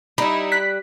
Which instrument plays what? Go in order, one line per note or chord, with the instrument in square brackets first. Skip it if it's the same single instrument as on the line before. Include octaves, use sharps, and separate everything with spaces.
[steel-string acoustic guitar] G3 [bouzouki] D#4 E4 [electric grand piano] B5
[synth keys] F#6 B6